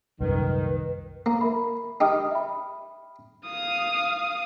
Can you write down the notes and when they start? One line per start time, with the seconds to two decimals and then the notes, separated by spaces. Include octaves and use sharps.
0.20 C2 F#2 A#2 D#3 B4
1.26 A#3 A#5
1.41 A#4 E5 B5
2.00 D#4 G4 G5 D#6 F6
2.31 E5 B5
3.46 F5 D#6